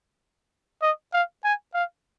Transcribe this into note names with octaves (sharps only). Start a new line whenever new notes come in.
D#5
F5
G#5
F5